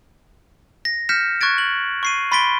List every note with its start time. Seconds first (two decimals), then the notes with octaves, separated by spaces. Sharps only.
0.85 A#6
1.09 F6 G6 A#6 B6 C#7 E7
1.41 C#6 F#6 G#6 A6 D7
1.58 F#7
2.03 C#6 C7 D#7
2.32 B5 C6 A6 B6 D7 G7